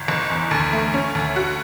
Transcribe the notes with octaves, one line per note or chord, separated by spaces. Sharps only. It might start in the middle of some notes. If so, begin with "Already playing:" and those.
Already playing: G1
F#1
E2
D2
A3
C#4
D2
F#4